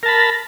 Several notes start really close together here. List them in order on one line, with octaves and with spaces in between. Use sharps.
A#4 A5 B5